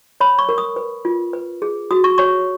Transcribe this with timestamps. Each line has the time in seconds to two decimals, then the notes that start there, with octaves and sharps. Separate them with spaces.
0.20 C#5 B5
0.39 C#6
0.49 A#4
0.58 D#6
0.76 B4
1.05 F4
1.33 B4
1.62 G#4
1.91 F#4 D#6
2.04 C#6
2.18 C#5 C#6